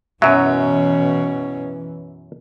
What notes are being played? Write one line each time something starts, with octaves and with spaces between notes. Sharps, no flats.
F#2 B2 E3 F#3 C#4 E5